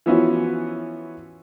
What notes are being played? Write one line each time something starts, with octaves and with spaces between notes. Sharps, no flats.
E3 F3 B3 C#4 E4 F#4